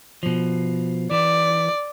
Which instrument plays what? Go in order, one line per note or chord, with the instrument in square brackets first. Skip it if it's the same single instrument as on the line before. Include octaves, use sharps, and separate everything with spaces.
[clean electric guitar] B2 F3
[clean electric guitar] E3 [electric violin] D5